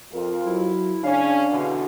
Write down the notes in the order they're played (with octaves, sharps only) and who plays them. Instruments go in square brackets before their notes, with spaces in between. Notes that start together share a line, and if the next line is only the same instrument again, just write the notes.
[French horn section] F2 F4 A#4
[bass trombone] F#3 [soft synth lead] E4
[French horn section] C#3 C#4 [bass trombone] D4 [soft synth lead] F5
[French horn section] E2 B2 D3